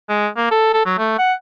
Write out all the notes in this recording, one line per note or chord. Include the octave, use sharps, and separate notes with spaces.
G#3
A#3
A4
A4
F#3
A3
F#5